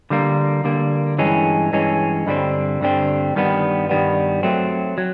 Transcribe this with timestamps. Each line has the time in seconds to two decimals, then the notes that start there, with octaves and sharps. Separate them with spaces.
0.10 D3 G3 A#3
0.64 D3 G3 A#3
1.18 G2 E3 G#3 C#4
1.73 G2 E3 G#3 C#4
2.27 G2 D3 G3 C4
2.81 G2 D3 G3 C4
3.35 G2 D#3 G3 B3
3.89 G2 D#3 G3 B3
4.43 F#3 A3 C4
4.98 F#3